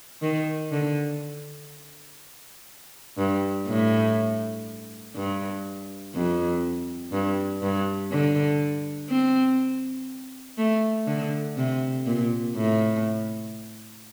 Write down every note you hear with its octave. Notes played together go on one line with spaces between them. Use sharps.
D#3
D3
G2
A2
G2
F2
G2
G2
D3
C4
A3
D3
C3
A#2
A2